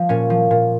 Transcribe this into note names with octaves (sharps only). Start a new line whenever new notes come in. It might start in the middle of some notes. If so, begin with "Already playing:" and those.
Already playing: F3
A#2 C#4
F3
A#2